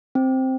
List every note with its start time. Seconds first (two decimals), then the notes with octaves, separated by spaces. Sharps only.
0.15 C4